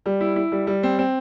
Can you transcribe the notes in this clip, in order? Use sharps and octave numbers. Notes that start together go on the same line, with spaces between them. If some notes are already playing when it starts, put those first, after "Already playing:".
G3
E4
E4
G3
G3
C4
C4